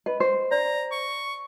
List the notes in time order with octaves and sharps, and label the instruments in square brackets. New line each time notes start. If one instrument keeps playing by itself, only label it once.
[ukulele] B4 [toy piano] D#5
[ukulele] C5
[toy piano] D5 [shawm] A#5
[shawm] C#6